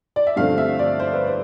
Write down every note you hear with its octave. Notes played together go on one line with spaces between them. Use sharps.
D5
E5
G2 D3 F3 A3 C4 F5
E5
D5
C5
B4
C5